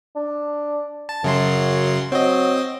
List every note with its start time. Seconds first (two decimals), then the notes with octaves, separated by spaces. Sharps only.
0.16 D4
1.09 A5
1.24 F#2 C#3 F#3 C6
2.12 F#3 C4 D#5